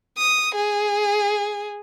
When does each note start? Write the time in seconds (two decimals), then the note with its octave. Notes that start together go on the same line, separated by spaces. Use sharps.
0.18 D#6
0.55 G#4